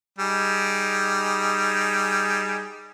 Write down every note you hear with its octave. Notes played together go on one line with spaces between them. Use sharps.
G3 D#4 G#4